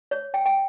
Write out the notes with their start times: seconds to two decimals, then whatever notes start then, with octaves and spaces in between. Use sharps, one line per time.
0.11 C#5
0.34 G5
0.46 G5